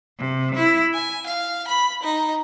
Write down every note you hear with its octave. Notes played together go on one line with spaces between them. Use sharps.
C3
E4
G#5
F5
B5
D#4